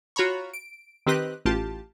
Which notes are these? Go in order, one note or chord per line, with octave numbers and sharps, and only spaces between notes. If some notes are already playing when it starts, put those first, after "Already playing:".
F4 F#4 C#5 A#5 B5 C#6
D7
D#3 C4 G4 B4 D#5 F#6
A1 F4 G4 A5